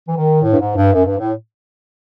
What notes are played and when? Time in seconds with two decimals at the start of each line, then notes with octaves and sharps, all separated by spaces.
0.08 E3
0.17 D#3
0.42 A2
0.52 G2
0.59 G#2
0.76 G2
0.93 F#2
1.06 G2
1.18 A2